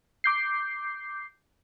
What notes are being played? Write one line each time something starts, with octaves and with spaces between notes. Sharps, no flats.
D6 G6 C7